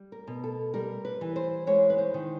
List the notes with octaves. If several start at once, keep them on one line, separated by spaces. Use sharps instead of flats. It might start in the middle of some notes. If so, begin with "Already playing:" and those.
Already playing: G3
A#4
B2
A4
G3 A#4
B4
E3
C5
G#3 C#5
B4
C5
D#3